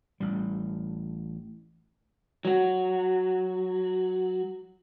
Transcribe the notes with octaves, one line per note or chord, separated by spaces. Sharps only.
A1 G3
F#3 F#4